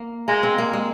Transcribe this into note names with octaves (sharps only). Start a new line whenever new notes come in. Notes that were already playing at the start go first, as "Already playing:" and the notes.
Already playing: A#3
G#3 A#3
C4
A#3
G#3